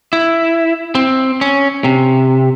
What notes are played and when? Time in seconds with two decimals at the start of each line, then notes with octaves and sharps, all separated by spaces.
0.13 E4
0.95 C4
1.41 C#4
1.84 C3